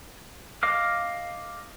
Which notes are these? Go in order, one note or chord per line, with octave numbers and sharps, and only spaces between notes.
D#5 F5 D6 F6